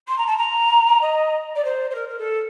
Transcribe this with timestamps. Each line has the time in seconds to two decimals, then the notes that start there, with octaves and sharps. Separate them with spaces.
0.07 C6
0.18 A#5
0.26 A5
0.37 A#5
1.01 D#5
1.55 D5
1.64 C5
1.90 C5
1.94 A#4
2.08 A#4
2.18 A4